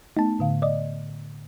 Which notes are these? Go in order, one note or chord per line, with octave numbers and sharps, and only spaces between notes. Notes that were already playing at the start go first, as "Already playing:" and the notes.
A3 B3 D#4 A5
A2 D3 F5
D5 D#5